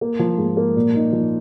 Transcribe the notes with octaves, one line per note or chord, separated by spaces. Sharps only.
A#3
F3
G#2
A#3
A#2
D#4
F3